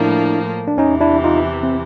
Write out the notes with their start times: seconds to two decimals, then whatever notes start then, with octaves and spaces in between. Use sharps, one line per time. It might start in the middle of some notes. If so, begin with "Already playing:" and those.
Already playing: A2 F3 A#3 D4 E4
0.68 D4
0.78 E2 C3 E3 C#4 D#4
1.01 D4 E4
1.24 D#4 F4
1.63 C4